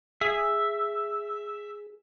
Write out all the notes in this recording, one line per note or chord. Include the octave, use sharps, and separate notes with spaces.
G#4 E5